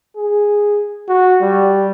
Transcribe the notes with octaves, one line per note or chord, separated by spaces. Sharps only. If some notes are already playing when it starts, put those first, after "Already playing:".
G#4
F#4
G3